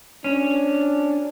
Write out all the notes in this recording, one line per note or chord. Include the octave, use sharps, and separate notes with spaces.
C#4 D4